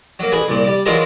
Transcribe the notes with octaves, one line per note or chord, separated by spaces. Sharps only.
F#3 A#3
A1 G#4 B4 G#5
C2 A#2
G3 D6
E3 F#3 G#3 F4 G#4 A#4